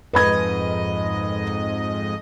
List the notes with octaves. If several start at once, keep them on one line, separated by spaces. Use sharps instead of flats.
F2 G#2 B4 D#5 B5 G#6